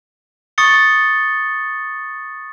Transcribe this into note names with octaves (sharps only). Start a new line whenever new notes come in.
C#6 D#6 A6 C#7 G7